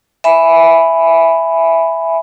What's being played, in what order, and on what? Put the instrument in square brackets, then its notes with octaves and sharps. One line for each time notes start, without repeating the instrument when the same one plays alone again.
[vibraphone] E5 G#5 B5